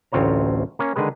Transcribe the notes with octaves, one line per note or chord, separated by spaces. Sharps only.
A1 D2 C4 F4 C#5 A#5
A#3 C#4
D3 D#3 G#3 G#4 B4